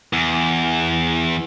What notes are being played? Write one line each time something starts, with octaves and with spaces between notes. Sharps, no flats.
E2